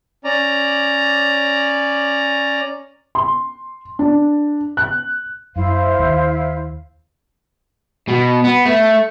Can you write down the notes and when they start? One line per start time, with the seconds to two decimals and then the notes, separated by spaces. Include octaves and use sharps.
0.24 C#4 D5 A#5
3.15 C6
3.99 D4
4.77 F#6
5.56 F#2 E4 C5 F5
5.99 D#2
8.09 B2
8.45 B3
8.66 A3